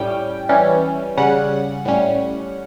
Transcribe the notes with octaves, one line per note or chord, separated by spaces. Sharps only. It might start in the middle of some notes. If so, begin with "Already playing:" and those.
Already playing: A2 G3 C#4 G5
E3 G3 C#4
C#3 G3 C#4 F#5
A2 G3 C#4